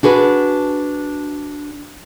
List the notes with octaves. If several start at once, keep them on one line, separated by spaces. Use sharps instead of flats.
D4 F#4 G#4 B4